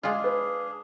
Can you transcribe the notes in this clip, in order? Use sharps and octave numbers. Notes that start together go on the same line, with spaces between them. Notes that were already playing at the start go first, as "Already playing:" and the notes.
G#3 D4 F4 G#4 F5
B4